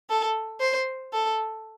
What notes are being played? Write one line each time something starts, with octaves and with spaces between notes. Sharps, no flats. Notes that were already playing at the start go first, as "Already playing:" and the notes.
A4
C5
A4